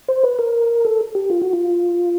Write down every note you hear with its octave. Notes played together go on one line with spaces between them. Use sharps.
C5
B4
A#4
A4
G4
F4
F#4
F4